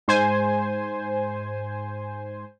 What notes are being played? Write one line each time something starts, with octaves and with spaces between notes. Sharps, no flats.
G#2 C5 G#5